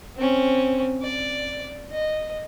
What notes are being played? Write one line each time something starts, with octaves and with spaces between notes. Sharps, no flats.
C4 C#4
D5
D#5